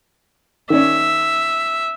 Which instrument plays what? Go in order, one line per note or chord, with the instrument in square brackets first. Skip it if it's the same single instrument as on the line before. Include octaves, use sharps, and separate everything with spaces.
[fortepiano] D#3 C#4 D5 [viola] E5